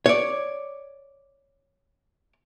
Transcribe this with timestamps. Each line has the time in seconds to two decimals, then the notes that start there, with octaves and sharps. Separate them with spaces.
0.06 C#5 D5